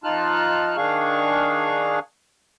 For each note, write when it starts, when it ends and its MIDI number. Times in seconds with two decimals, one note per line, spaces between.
0.04 0.77 41
0.04 0.77 63
0.04 0.77 65
0.04 0.77 81
0.04 0.77 89
0.04 0.77 90
0.77 1.99 51
0.77 1.99 62
0.77 1.99 68
0.77 1.99 77
0.77 1.99 85